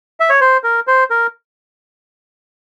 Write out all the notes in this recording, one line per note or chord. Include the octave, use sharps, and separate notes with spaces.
E5
C#5
C5
A#4
C5
A#4